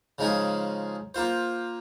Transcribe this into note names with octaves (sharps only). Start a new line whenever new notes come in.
C#3 F3 G#3 D#4 G#4
A#3 F4 C5